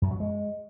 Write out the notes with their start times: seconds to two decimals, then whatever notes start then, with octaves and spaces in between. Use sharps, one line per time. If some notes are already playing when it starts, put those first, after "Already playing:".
0.02 F#2
0.11 F#3
0.20 G#3